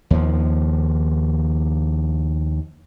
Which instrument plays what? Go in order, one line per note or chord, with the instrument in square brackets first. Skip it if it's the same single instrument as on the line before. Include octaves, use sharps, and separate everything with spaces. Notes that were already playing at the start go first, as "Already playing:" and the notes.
[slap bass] D#2 F3